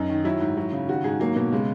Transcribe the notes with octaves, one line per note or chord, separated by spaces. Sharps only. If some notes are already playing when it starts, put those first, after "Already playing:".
Already playing: F#2 D#4
D#3
F#3 E4
G#2
F#3
C#3
D#3 F#4
G#2 G#4
F#3 A#3
B2 A#3
C#3 G#3